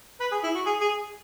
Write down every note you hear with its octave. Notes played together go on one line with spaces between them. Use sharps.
B4
G#4
E4
F#4
G#4
G#4